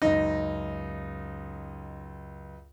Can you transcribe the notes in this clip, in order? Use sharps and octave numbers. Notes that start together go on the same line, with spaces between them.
C#2 F#2 D#4 A#6